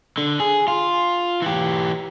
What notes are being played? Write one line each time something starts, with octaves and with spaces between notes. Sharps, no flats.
D3
G#4
F4
E3 G4